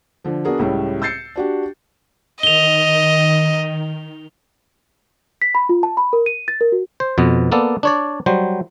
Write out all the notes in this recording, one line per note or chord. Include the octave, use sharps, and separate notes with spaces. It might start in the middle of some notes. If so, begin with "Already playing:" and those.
D3 F3
B3 D4 F#4 G#4 A#4
C#2 A2 G3 C#4
E6 G6 A6 C7 C#7
D4 F#4 G4
D#3 D#5 F7 G7
B6
B5
F4
A5
B5
A#4
D#7
A6
A#4
F#4
C5
F2 B2 B3
A#3 B3 A4 D5
D4 C#5 D5
F#3 G3 C5